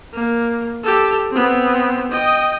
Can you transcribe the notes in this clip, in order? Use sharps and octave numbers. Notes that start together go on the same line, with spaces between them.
A#3
G4 A4
B3 C4
D#5 G5